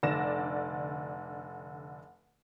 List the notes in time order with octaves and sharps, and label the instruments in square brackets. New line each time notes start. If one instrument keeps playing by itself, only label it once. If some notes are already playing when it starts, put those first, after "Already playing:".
[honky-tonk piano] F1 D3 D5 A#6 E7